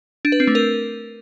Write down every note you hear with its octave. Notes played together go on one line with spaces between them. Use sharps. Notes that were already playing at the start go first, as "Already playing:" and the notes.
D4
B4
C4
A3
A#4